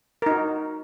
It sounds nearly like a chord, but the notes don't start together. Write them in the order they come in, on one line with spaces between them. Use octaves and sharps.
A#4 D#4 F#4